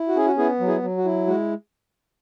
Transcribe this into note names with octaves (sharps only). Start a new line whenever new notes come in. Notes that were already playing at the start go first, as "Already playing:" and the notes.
Already playing: E4
F#4
C#4 G#4
F#4
B3 E4 G#4
F#3
E4 G#4
F#3
F#4
E4
G#3 F#4